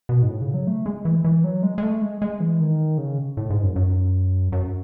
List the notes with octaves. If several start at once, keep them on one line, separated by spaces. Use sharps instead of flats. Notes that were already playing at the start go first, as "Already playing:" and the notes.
B2
G#2
A2
C#3
F#3
A3
G#3
E3
E3
F#3
G#3
G#3
A3
G#3
G#3
E3
D#3
C#3
A2
G#2
F#2
F#2
F#2